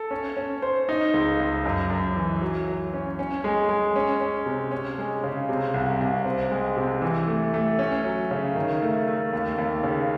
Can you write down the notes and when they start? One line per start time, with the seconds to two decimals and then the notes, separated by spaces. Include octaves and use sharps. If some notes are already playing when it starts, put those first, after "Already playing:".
Already playing: A4
0.11 C#4
0.37 C#4
0.62 C5
0.89 D#4
1.14 C#2
1.40 C#2
1.65 F#2
1.90 F#2
2.16 E3
2.42 F#3
2.67 F#3
2.93 C#4
3.19 C#4
3.44 G#3
3.69 G#3
3.96 C#4
4.20 C#4
4.46 C3
4.71 C#4
4.98 G#3
5.24 C#3
5.49 C3
5.74 C2
6.00 C2
6.25 C4
6.51 G#3
6.77 C3
7.02 E3
7.27 A3
7.54 A3
7.79 C#4
8.04 F#3
8.31 C#3
8.55 D#3
8.82 A3
9.08 A3
9.33 D#2
9.58 D#2
9.83 C#3